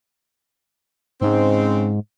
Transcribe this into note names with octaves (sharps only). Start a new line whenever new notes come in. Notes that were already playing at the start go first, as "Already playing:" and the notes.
G#2 C#3 G#3 C4